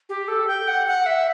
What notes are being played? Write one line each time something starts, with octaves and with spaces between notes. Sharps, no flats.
G4
A4
G5
F#5
F#5
E5